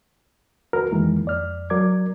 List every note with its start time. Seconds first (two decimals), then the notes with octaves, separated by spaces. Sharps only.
0.73 D#2 F#4 A#4 B4 F6
0.92 F2 D#3 E3 G#3 A#3
1.25 F2 D5 F6
1.70 F#3 A#4 D5 D6 G#6